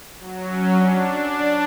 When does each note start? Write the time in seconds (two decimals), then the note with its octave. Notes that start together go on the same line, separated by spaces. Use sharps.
0.19 F#3
0.47 C#4
0.75 D4
1.31 D4